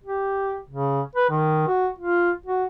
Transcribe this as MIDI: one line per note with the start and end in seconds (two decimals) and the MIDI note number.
0.04 0.58 67
0.69 1.01 49
1.15 1.29 71
1.30 1.64 51
1.68 1.88 66
1.98 2.30 65
2.46 2.65 66